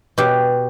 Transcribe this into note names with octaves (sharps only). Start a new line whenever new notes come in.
B2 G4